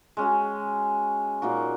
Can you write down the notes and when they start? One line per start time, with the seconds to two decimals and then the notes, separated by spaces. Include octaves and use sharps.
0.17 G#3 C#4 F#4
1.42 A#2 A#3 D#4 F#4